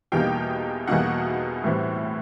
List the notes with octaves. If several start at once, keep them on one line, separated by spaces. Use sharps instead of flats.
E2 B2 G3 A#3 D#4 G4 G5
E2 B2 G3 A#3 D#4 F#4 F#5
A2 E3 G3 C4